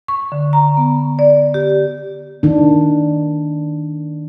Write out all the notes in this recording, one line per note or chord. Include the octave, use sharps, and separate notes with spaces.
C#6
D3
A#5
B3
D5
G4
D#3 D4